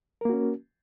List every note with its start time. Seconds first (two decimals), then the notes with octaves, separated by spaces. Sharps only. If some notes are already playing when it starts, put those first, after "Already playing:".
0.21 A#4
0.25 A#3
0.29 F#4
0.33 C#4